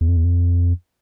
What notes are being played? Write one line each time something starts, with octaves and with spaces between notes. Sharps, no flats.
E2
F2
E2
F2